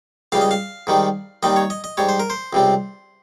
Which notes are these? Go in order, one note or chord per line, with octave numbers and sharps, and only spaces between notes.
C#2 C#3 G3 F5
D#5
F5
G#2 D#3 G3
D#2 D#3 G3 D#5
C#5
D#5
D#5
G#2 G3 C#5
C5
A#4
C5
C#2 C3 G3